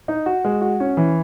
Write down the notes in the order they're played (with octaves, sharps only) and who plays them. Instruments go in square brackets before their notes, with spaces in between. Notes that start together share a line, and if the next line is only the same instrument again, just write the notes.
[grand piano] D#4
F#4
G#3
F#4
C#4
E3